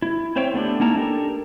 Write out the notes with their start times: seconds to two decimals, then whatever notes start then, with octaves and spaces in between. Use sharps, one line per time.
0.02 E4
0.36 C4 C5 C#5 E5 G5
0.54 A3 B3 D4 G4
0.80 A#3 C#4 D#4 E4 A5 A#5
0.96 D4 G4 A4 A#4